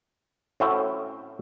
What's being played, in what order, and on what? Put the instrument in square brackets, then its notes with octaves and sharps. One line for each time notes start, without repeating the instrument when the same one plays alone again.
[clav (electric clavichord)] A2 C4 C#4 F#4 E5 G5